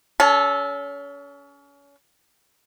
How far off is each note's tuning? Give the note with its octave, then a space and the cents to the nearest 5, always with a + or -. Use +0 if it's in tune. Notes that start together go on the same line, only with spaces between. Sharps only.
C#4 +30 A4 -10